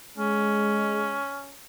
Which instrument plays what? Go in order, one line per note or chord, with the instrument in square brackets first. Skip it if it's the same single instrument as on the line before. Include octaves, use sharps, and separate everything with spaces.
[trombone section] G#3 [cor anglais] C#4